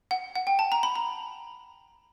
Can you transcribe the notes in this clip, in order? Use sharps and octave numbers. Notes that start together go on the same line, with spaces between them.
F#5
F#5
G5
A5
A#5
B5
A#5